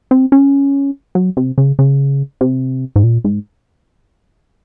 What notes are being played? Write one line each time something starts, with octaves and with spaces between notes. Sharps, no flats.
C4
C#4
F#3
C3
C#3
C#3
C3
G#2
A#2
G#2